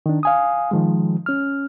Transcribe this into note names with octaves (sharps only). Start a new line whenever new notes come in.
D#3 D4
F5 G#5 D#6
D#3 F3 G#3
C#4 F6